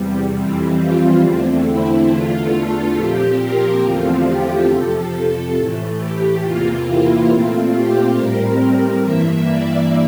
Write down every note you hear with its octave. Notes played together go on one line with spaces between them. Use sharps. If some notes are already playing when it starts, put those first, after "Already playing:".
Already playing: E2 C3 G3
F2 E3 G3 C4
F4
E2 D3 A3 C4
E4
E2 D3 A3 F4
A4
A#2 F3 C4 G4
A#4
E2 D3 F3 A3 C4 F4
G4
F2 C3 F3 A4
A2 E3 A3
G4
E2 C3 E3 A#3 F4
E4
A#2 A3 C4 F4
G4
A2 G3 C4 A#4
A#4
G2 E3 A#3 E5
D5